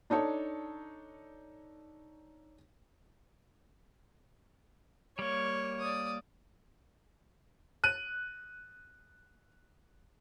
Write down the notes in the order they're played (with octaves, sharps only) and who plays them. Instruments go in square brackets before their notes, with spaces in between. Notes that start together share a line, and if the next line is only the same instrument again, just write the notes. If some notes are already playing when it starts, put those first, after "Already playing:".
[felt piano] D4 D#4 A4 C#5
[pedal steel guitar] G3 A#3 [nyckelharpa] C#5
[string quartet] D5 D#6
[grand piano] F#6 D#7